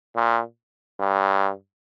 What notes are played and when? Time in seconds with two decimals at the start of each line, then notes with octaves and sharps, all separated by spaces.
0.15 A#2
1.00 G2